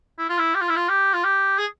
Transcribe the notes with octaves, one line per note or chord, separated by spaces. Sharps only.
E4
F4
E4
G4
F4
E4
F4
G4
F4
G4
G#4